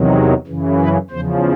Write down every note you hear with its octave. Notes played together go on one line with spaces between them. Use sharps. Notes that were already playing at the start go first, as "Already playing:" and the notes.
Already playing: E2 C3 D#3 F#3
F#2 C#3 E3
B4
E2 C#3 F3 C5